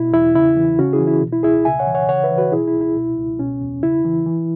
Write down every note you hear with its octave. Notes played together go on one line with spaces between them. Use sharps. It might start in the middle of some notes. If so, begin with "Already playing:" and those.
Already playing: B2 E4
E2 E4
C#3 E4
E3
C#3 C#4 F#4
E4 G#4
E3
E4
B2
E4
C#2 E4 G#4
C#3 E5 G#5
C#5 F#5
E3
C#5 F#5
C#3 C#5 F#5
B4 E5
E3
F#4 B4
B2 E4 G#4
E4
C#2
E4
B2
C#2
B2 C#4
E2
C#3 E4
E3
E3